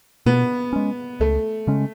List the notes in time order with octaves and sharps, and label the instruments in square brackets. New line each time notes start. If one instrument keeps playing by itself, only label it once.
[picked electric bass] B2 [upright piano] B3
[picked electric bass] G#3 C#4
[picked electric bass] C#2 [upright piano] A3
[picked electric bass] C#3 G#3 C#4